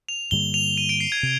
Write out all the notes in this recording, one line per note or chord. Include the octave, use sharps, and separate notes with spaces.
F7
G2 D3 G3 A#3 G7
F7
D#7
D7
C7
G#6
C3